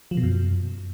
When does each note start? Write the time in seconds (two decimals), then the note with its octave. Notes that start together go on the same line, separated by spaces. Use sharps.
0.11 F3
0.17 B2
0.23 F#2